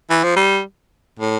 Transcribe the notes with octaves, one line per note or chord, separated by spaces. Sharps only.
E3
F3
G3
A2